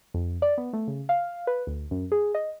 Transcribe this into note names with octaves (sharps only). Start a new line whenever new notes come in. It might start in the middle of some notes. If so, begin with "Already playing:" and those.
F2
D5
B3
A3
C#3
F5
B4
D2
F#2
G#4
D#5